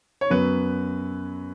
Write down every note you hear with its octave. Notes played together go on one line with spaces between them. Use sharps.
C#5
F#2 F#3 B3 B4